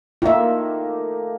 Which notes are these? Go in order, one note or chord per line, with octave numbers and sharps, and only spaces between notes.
D#3 A3 A#3 F4 E5